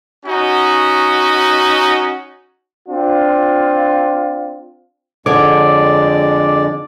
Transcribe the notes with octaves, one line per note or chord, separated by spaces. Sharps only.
C#4 D#4 F#4
C4 D4 F4
F2 D3 G#3 C#5 D5 D6